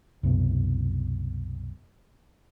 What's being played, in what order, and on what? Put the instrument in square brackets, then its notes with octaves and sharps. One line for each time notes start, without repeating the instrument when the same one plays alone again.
[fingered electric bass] C2 F#2 B2